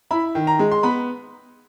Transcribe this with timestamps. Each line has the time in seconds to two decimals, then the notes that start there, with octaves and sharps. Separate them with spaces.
0.11 E4 B5
0.35 D#3
0.47 A#5
0.59 G#3
0.72 C6
0.83 B3 B5